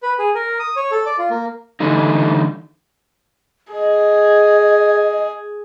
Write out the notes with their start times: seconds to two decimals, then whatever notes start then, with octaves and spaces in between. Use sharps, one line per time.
0.03 B4
0.19 G#4
0.35 A#4
0.59 D#6
0.76 C#5
0.91 A4
1.06 D5
1.18 F4
1.30 A#3
1.80 D3 E3 G3 A3 D#4
3.73 G#4 D#5